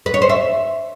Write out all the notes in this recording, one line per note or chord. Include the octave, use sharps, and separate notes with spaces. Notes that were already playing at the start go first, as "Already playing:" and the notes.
B4
C#5
C5
E5